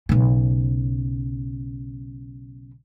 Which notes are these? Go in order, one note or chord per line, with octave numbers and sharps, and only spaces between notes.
B1 C#3